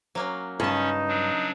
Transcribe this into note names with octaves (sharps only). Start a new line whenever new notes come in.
F#3 A#3 C#4
G2 C#3 C#4 D#4 A5
F#3 D4